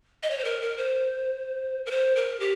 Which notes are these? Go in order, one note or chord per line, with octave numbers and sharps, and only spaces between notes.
D#5
C#5
C5
A#4
A#4
C5
A#4
C5
A#4
G4